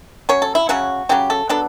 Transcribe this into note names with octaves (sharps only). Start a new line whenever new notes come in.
F#3 C#4 C#5
A4
E4
C#3 F#3 C#4 F#4
C#3 F#3 C#4 G4
A4
F#3 B3 D4 A4